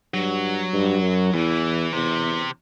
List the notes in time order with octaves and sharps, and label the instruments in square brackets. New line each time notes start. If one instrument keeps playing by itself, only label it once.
[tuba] G2 [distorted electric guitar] F#3
[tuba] G2
F#2
[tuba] E2 [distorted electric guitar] E3
[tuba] E2 [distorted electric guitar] C3